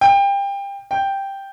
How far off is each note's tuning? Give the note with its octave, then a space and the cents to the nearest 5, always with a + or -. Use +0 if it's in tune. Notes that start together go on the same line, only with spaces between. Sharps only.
G5 +25
G5 +0